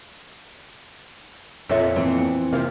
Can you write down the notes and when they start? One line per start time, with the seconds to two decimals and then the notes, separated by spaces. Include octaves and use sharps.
1.69 F2 A#2 A4 C#5 E5 C#7
1.96 E3 C4
2.53 C3 A#3 F4